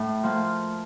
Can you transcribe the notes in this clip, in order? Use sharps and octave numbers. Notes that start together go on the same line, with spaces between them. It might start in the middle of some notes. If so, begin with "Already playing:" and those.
Already playing: A2
F3 A#3